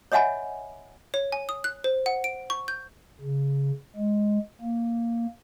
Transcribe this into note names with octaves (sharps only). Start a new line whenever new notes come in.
C#5 D#5 E5 F#5 G#5 B5
C#5
G#5
D#6
F#6
C5
F#5
D7
C#6
G6
C#3
G#3
A#3